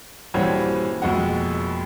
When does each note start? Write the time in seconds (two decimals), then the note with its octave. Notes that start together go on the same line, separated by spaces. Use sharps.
0.34 D#1 G2 E3 C4 F#4 C#5
1.02 F#1 F2 B2 G#3 F#5